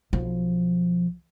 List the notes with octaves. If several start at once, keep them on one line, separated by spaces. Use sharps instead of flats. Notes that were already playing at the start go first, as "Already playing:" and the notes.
B1 F3